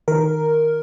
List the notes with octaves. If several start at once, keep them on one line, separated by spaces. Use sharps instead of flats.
D#3 A#4